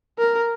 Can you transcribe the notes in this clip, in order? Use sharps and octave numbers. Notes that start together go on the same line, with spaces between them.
A#4